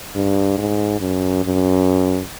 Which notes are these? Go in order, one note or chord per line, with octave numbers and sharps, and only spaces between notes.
G2
G#2
F#2
F#2